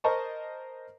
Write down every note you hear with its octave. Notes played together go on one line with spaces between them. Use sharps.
A#4 C5 D#5 A5 A#5 C#6